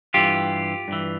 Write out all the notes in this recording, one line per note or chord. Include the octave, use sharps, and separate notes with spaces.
G2 E3 F4 G4
G2 E3